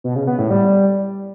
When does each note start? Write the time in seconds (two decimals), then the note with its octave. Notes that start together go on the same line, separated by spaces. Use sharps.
0.04 B2
0.16 C#3
0.27 B3
0.39 A2
0.50 G3